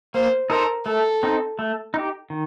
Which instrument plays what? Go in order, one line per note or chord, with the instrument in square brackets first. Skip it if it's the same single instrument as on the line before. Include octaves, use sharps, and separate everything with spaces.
[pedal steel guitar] A#3 [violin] C5
[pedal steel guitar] D#4 A4 C5 [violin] A#4
[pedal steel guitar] A3 [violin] A4
[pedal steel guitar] C4 D#4
A3
D#4 G4
D#3